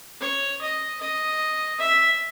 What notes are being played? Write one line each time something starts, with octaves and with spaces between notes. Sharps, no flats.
C#5
D#5
D#5
E5